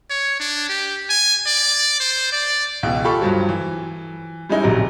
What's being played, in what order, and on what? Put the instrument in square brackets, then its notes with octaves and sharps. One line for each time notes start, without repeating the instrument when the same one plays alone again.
[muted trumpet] C#5
D4
G4
G#5
D5
C5
D5
[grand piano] C#2 B2 E3
F4 G4 A4 B5 C#6
G2 F3 F#3
E3
G3 G#3 C#4 D#4 E4
D#1 A#1 C3 F#3 A#5